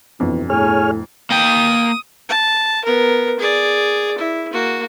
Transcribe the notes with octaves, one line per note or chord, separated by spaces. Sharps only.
G1 F2 B2 E3
A2 G#4 C#5 G#5 F6
A#3 G5 D#6
A5
B3 A#4
G#4 D5
E4
A#3 F#4